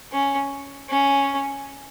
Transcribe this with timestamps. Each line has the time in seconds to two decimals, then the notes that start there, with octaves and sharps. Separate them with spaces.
0.12 C#4
0.89 C#4